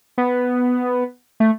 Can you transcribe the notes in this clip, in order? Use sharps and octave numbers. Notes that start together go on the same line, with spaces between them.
B3
A3